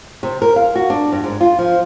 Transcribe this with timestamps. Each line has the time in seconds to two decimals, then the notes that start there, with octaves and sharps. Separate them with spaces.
0.23 C3
0.42 A#4
0.56 F5
0.76 F#4
0.90 D4
1.12 G2
1.24 G#2
1.41 F4
1.59 F3